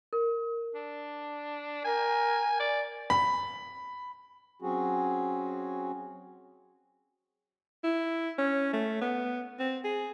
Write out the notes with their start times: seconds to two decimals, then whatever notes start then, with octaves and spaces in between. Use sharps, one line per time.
0.13 A#4
0.75 D4
1.85 A#4 G#5
2.60 D5
3.10 B5
4.62 F#3 C4 C#4 F#4 G#4
7.84 E4
8.38 C#4
8.73 A3
9.01 B3
9.59 C4
9.84 G#4